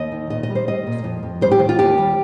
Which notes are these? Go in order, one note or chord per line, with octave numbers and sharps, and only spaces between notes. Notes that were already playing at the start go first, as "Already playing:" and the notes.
Already playing: D#2 D#5
D#3
A#2 D#5
D#5
G3
C5
G3 D#5
A#2
F2
F2
G3 C5
G4
D#3
F4
D#2 G4
G3